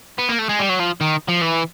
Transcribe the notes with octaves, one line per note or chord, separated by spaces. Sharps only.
B3
A#3
A3
G#3
G3
F#3
F3
D#3
F3
E3